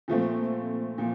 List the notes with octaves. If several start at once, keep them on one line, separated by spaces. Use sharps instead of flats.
A#2 F3 A3 C4
A#2 F3